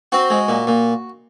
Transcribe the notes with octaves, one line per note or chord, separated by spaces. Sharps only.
C4 F#4
G#3
A#2
A#2